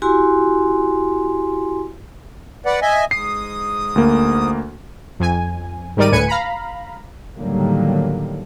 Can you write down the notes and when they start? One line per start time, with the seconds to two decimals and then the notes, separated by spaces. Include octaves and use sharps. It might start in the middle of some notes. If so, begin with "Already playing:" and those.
0.02 E4 F#4 G4 G#5 C6
2.66 B4 D5 F#5
2.82 D#5 E5 G#5
3.11 G#2 D#6 C7
3.96 D2 A#3
5.20 F2 G#5
5.97 G#2 D#3 G3 A#4 D5 D#7
6.12 D2 A2 B4 G#5 C#7 D#7
6.28 F5 A#5 B5
7.37 A2 D3 D#3 F#3 G3 A#3